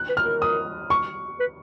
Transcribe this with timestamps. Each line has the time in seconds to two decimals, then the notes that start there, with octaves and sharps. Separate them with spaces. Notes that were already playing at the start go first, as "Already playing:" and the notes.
Already playing: F#6
0.09 B4
0.17 F6
0.25 A#4
0.42 D#6
0.90 C#6
1.40 B4